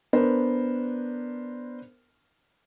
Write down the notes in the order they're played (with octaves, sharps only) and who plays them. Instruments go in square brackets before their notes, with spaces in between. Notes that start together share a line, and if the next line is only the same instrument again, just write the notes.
[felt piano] B3 D4 A#4 C5